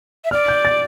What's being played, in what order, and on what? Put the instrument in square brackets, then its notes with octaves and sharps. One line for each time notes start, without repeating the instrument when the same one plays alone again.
[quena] E5
[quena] D5 [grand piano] F6
[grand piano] G6
A6